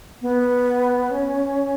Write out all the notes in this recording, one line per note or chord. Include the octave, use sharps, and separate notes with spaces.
B3
C#4